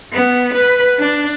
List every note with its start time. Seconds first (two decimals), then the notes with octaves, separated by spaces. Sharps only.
0.13 B3
0.54 B4
0.99 D4